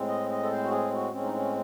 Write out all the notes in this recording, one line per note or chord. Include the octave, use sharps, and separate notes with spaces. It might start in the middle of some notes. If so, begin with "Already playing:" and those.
Already playing: A2 G#3 C4
D#5
D#5
A4
C5
F#4
G#4
F#4
A2 G#3 C4 C#4
D#4
C#4